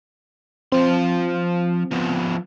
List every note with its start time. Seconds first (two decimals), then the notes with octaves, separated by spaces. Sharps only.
0.72 F3 C4 C6
1.91 F3 B3